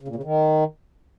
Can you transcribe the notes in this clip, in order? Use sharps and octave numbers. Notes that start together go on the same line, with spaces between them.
C#3
A#2
C#3
D#3